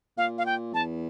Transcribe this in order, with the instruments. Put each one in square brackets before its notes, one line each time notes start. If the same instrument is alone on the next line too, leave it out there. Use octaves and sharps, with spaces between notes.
[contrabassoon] A#2 [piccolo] F5
[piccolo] F5
G5
[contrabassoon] E2 [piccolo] A5